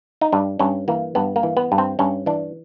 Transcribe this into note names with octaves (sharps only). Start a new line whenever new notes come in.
D#4
G2 D4
G2 C#4
E3 A#3
G2 B3
A#3
E3
B3
G2
C4
G2 C#4
E3 D4